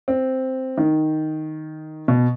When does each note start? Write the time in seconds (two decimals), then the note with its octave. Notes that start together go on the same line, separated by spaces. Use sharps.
0.08 C4
0.78 D#3
2.08 B2